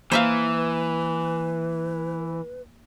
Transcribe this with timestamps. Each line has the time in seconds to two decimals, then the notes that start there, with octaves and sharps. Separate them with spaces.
0.12 E3 A#3 B4 C5 E5 F5